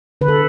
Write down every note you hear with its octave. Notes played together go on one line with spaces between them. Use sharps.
D3 B4
A4